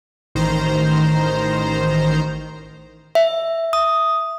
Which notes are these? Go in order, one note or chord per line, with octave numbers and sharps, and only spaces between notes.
A1 D#3 C5 A#5
E5
D#6